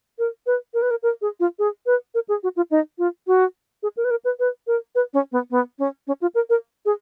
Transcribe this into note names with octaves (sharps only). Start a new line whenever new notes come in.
A#4
B4
A#4
B4
A#4
A#4
G#4
F4
G#4
B4
A#4
G#4
F#4
F4
D#4
F4
F#4
G#4
A#4
B4
A#4
B4
B4
A#4
B4
C#4
B3
B3
C#4
C#4
F4
A#4
A#4
G#4